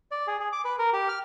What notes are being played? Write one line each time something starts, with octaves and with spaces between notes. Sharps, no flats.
D5
G#4
G#4
D6
B4
A#4
G4
F6